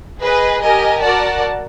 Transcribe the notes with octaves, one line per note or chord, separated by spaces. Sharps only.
G#4 B4 D#5
G4 A#4 D#5 G#5
F#4 A#4 D5 F#5 A5